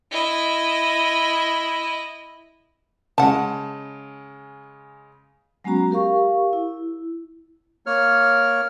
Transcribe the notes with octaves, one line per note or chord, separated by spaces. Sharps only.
E4 D#5
C#3 G#3 F#5 A5
F#3 G#3 B3 C#4 F#4 A#5
G4 A#4 F5 C#6
E4
A#3 C#5 F6